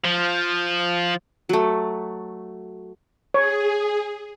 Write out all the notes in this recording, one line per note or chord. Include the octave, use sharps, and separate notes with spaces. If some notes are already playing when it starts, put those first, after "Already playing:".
F3
F#3 A3
G#4 C#5